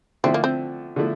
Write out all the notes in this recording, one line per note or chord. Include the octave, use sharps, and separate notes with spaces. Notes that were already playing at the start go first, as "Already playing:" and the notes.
D3 F3 A3 C4 E4
A#3
C4
D3 F3 A3 E4